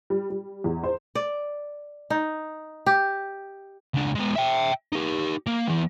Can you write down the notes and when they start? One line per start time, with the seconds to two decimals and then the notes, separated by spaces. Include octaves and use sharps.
0.10 G3
0.30 G3
0.64 E2
0.84 C5
1.15 D5
2.10 D#4
2.86 G4
3.94 C#2 D4
4.15 G#3 B3
4.36 E5 G5
4.92 D#4 G4
5.46 A#3
5.68 E3 B3